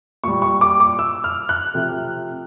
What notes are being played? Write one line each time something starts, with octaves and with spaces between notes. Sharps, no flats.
A#2 G3 C#6
C#6
D6
D6
E6
F6
F#6
C3 F3 A3